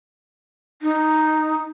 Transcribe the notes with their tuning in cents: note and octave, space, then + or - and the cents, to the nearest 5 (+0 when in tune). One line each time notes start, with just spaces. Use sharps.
D#4 -5